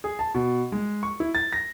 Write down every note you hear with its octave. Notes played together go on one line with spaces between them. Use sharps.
G#4
A5
B2
G#3
C#6
E4
A6
A#6